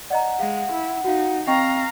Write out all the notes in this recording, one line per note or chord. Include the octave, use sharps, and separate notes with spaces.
D5 D#5 F#5 A#5
G#3 F5
E4
D#4 F#4 F5 F#5
C4 D#5 F5 G5 A#5 C#6